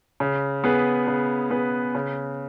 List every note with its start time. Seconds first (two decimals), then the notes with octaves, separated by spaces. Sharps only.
0.20 C#3
0.64 B3 G#4 B4
1.07 C#3
1.50 B3 G#4 B4
1.95 C#3